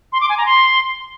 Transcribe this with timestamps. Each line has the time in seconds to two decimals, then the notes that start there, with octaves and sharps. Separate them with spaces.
0.13 C6
0.21 D6
0.29 G#5
0.38 A#5
0.46 C6